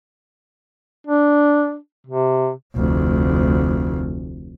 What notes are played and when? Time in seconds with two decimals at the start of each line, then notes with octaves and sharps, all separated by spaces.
1.07 D4
2.07 C3
2.75 F1 D2